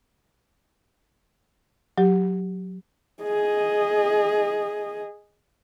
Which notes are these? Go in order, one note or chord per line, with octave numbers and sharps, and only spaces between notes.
F#3 G4
G#4 D#5